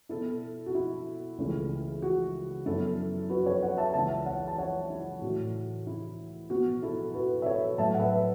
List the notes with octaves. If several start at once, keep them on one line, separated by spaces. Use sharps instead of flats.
B2 B3 E4 A4
F#4
E4
C#2 C#3 E3 A3
F#4
F#2 F#3 B3 E4 A4
F#4 B4
A4 C#5
C#5 F#5
E5 A5
C#2 C#3 E3 E5 A5
C#5 F#5
A5
C#5 F#5
E4
A2 E3 A3 F#4
E4
B2 B3 F#4
E4 A4
F#4 B4
E5
A4 C#5
A2 F#3 A3 E5 A5
F#5
B4 E5